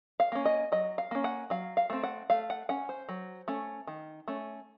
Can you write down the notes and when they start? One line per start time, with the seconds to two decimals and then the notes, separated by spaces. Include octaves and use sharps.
0.20 F5
0.32 A#3 C#4
0.45 D#5
0.72 F#3 D#5
0.98 F5
1.11 A#3 C#4
1.24 F#5
1.50 F#3 F5
1.77 F5
1.90 A3 C4
2.03 F#5
2.30 A3 F5
2.50 F#5
2.69 C#4 F#5
2.89 C5
3.09 F#3
3.48 A3 C#4
3.87 D#3
4.28 A3 C#4